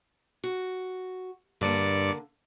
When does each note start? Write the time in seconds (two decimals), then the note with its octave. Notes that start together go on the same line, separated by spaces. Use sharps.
0.44 F#4
1.61 G2 D3 A#3 D5 C#7